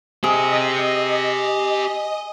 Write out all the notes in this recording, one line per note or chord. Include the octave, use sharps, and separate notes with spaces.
G4 G#4 C5 D#5